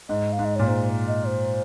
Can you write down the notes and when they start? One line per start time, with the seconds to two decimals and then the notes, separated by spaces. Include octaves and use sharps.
0.09 G#2 D#5
0.33 F5
0.39 G#2
0.45 D#5
0.56 A#2 C#5
0.67 G#2 C5
1.08 D#5
1.27 C5